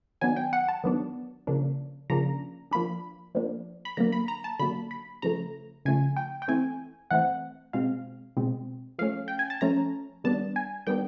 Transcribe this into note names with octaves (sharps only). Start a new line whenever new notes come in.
D#3 F#3 B3 D4 G#5
G5
F#5
A5
D#3 F#3 B3 D4
C#3 F3 A#3 D4
C#3 F3 A#3 D4 A#5
F3 A#3 D4 B5
F3 A#3 D4
B5
D3 F#3 A#3 A#5
B5
A#5
A5
D3 F#3 A#3 B5
B5
C#3 F3 A3 A#5
C#3 F3 A3 G#5
G5
G5
E3 A3 C4 G#5
E3 A3 C4 F#5
B2 G#3 C4 F5
B2 G#3 C4
F3 A3 C#4 F5
G5
G#5
A5
F3 A3 C#4 A#5
D#3 G3 B3 D4 A5
G#5
D#3 G3 B3 D4 G5